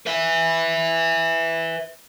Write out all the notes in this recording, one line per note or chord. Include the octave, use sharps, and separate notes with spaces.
B4 E5